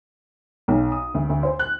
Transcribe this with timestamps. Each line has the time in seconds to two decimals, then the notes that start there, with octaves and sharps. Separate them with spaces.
0.68 B1
0.92 D#6
1.14 D2
1.29 D2
1.43 C5
1.59 F#6